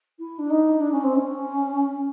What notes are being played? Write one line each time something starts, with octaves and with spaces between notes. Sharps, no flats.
E4
D4
D#4
D4
C#4
C4
C#4